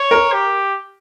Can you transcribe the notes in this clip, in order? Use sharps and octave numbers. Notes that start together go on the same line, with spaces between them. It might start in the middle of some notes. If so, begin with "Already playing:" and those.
Already playing: C#5
A#4
G4